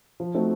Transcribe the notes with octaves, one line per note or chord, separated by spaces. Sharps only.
F3
A3 C4 D#4 F#4